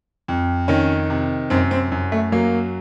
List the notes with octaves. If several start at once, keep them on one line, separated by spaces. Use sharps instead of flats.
F2
D#3 C#4
C3
F#2 C4
C4
F#2
A3
F#3 A#3